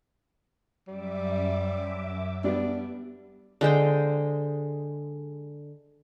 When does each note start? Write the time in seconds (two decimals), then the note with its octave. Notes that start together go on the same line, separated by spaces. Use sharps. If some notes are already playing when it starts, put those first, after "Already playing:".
0.88 F#2 G3 E5 D6
2.44 G3 B3 D4
3.61 D3 G#3 C5 G5